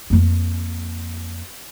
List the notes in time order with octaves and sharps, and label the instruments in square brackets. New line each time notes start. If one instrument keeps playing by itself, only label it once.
[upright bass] F2 A#3